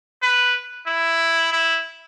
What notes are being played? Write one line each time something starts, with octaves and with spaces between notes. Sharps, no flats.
B4
E4
E4